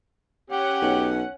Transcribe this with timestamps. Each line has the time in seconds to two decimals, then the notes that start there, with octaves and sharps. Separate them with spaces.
0.50 C#4 G4 F#5
0.82 B1